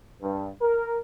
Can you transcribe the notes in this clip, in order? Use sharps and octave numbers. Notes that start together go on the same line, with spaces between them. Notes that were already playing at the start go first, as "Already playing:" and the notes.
G2
A#4